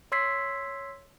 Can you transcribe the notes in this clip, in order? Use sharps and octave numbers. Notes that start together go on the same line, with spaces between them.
C#5 C6 E6 G#6 B6 C7